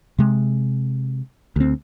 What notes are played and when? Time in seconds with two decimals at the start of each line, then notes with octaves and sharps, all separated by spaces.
0.19 C3 G#3
1.56 D2 C4